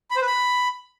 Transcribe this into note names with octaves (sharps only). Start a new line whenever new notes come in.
B5
C5
B4
B5